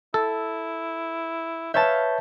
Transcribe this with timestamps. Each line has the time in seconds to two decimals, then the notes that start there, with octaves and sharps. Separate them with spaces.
0.14 E4 A4
1.74 B4 C#5 E5 F5 A5 G6